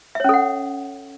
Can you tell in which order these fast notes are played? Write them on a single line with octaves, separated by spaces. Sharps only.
E5 C#5 C#4 A4 F#5